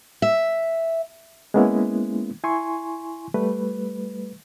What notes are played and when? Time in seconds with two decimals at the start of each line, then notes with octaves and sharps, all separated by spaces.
0.22 E5
1.54 G#3 A#3 B3 C#4 E4
2.44 E4 G#5 C6 C#6
3.34 G3 A3 B4